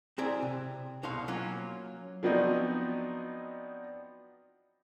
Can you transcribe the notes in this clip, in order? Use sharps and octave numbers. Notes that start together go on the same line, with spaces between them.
C4 E4 G#4 A#4 D5 G5
C3
C2 B2 D#4 C#5 F5 C6
F#3 A#3 C#4 F4
F3 F#3 B3 C4 D4 D#4